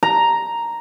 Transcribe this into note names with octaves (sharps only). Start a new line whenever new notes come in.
A#5